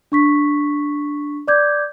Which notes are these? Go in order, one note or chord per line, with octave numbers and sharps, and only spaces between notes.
D4 C#6 B6
D5 D6 G6 G#6